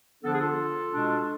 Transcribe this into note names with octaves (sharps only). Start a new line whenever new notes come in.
D3 F3 B3 D4 A4
G#4
F4 A4
B2 G#3 D4